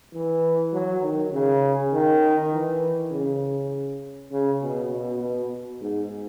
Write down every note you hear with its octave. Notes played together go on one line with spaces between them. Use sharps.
E3
F#3
D#3
C#3
D#3
E3
C#3
C#3
B2
B2
B2
G#2